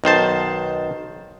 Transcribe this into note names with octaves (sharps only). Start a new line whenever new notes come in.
B1 D#3 C5 A5